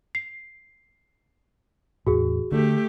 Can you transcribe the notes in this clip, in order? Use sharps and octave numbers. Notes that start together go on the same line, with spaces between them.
C7
E2 A2 F#4 G#4
D3 A3 D4 G4